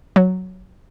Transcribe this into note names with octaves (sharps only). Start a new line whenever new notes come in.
F#3